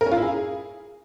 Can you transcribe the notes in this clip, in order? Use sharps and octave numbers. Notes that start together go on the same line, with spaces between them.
A#4
C#4
F4
E4
G#4